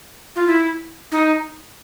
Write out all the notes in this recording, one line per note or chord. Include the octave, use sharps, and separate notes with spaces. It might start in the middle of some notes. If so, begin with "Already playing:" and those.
F4
E4
D#4